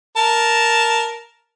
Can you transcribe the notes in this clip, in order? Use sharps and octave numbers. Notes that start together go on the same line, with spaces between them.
A#4 A5